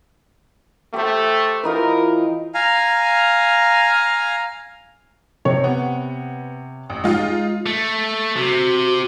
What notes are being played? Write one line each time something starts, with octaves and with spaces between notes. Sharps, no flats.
A3 G4 C5
E3 D#4 F4 A#4
F5 G#5 A#5
C3 C#5
B3
A1
G#3 D#4 F4
A3
C3 F#4